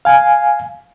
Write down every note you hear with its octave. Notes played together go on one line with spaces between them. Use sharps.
F5 G#5